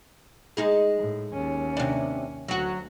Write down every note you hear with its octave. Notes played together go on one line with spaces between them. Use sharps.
G#3 D#4 G#4
A2
D#2 C#4
C3 D4
D2 F#3 F#4